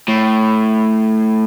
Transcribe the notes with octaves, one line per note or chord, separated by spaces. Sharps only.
A2